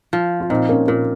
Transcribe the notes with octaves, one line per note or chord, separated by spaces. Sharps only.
F3
F4
A#2 C4 D#4
A#3 C#4
A#2 A#3